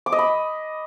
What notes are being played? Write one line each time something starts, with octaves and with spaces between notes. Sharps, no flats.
D6
D#5
B5